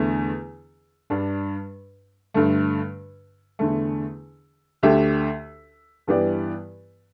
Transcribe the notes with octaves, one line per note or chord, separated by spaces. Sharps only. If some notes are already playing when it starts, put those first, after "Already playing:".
Already playing: E2 D3 A3
G2 G3 D4
G2 D3 A3
E2 D3 A3
D2 D3 A3 G4 E5
G2 E3 B3 G4 D5